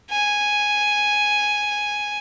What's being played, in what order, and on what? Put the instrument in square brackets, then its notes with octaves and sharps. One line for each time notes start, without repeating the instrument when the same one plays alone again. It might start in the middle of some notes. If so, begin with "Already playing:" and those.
[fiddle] G#5